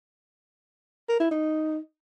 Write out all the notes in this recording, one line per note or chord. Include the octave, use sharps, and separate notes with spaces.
A#4
E4
D#4